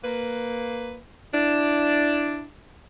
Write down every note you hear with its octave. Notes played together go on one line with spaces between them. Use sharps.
A#3 B4
D4 E4